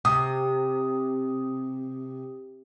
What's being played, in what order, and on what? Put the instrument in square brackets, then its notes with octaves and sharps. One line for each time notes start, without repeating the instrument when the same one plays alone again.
[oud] C3 [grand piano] D#6